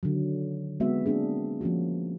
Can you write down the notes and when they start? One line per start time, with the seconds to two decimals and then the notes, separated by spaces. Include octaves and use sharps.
0.03 D3 D#3 F#3
0.80 G#3 B3 C4 F#4 E5
1.06 A#3 C4 D4 G#4
1.61 F3 A#3 C#4 F#4